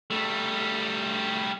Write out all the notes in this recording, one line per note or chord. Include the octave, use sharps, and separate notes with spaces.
G3 A3